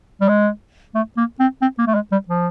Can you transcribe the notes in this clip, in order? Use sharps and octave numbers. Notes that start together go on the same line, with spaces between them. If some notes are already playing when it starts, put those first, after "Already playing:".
G3
G#3
A3
A#3
C4
C4
A#3
A3
G#3
G3
F3